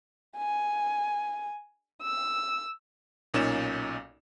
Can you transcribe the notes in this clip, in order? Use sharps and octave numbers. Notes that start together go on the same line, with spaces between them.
G#5
E6
B1 A#2 C#4 D#4 C#5 E7